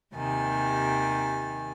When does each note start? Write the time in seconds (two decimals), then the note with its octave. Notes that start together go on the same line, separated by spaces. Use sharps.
0.14 D#2 C3 D#3 G#5 A6